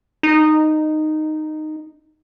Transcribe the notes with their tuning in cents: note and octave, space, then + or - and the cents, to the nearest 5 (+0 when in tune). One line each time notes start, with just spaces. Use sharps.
D#4 -10